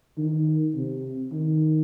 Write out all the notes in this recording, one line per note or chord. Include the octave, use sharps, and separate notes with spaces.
D#3
C3
D#3